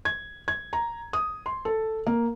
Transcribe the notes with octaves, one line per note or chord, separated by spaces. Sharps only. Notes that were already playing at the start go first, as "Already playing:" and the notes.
G#6
G#6
A#5
D#6
C6
A4
A#3